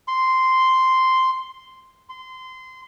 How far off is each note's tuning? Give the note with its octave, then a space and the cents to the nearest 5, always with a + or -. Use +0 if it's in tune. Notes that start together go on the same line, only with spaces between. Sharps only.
C6 -5
C6 -25